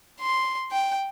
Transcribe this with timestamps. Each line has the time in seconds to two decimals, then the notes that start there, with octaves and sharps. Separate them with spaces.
0.20 C6
0.72 G5